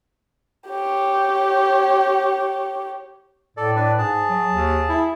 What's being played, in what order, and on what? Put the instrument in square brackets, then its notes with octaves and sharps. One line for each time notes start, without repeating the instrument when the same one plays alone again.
[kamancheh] G4 C#5
[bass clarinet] A2 [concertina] A4 D5
[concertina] D4 B4 D5
[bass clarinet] G#2 [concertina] G#4 A5
[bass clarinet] F#3
D#2
E4